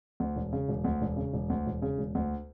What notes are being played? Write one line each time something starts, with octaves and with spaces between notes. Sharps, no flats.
D2
E1
C#3
E1
D2
E1
C#3
E1
D2
E1
C#3
E1
D2